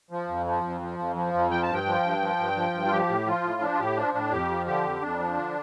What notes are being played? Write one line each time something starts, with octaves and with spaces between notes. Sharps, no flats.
F3
F2
F3
F2
F3
F2
F3
F2
F3 G5
A5
G2
G5
F3
G2
F3
G2
F3
G2
F4
F3 G4
A2
F3 F4
A2
F3 D4
F4
A2 G4
F3 D4
A2 D4
F2 G4
F3
D3 G4
F2
F2 D4
F3
D3